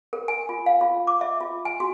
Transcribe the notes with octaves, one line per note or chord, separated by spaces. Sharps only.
A#4
G#5
F4
F5
F4
D6
E5
F4
G#5
F#4